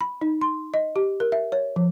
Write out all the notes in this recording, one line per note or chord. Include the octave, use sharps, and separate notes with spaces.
B5
D#4
C6
D#5
G4
A#4
E5
C#5
F3